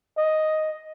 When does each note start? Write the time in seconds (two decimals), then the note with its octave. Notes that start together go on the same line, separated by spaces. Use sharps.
0.17 D#5